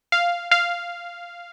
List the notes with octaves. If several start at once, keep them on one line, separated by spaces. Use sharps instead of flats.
F5
F5